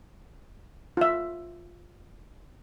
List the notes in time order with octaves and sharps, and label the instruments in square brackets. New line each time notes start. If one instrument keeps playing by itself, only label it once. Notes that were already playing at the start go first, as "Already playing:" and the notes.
[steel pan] F4 E5